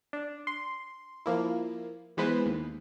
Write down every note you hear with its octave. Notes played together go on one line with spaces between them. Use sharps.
D4
C6
F3 A#3 E4
E3 G#3 B3 B4 C5
D#2